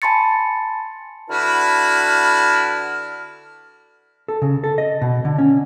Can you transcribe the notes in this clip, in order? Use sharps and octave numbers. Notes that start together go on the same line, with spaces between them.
G#5 A5 B5 C6 A6 C#7
D3 E4 F#4 B4 A5 F6
A4
C#3
A4
D#5
B2
D3
C#4